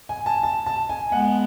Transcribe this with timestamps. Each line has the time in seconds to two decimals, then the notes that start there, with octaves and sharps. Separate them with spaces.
0.09 G#5
0.26 A5
0.43 A5
0.66 A5
0.89 G#5
1.12 G#3 B3 F#5